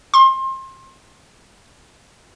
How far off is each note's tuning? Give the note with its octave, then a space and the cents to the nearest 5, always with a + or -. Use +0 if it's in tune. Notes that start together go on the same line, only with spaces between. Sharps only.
C6 +30